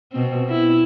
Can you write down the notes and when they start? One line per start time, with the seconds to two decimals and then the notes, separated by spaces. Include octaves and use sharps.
0.12 B2 C4
0.49 E4